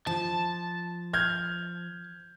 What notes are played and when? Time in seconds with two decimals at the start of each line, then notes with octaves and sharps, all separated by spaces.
0.07 F3 A5
1.13 F6 G6 G#6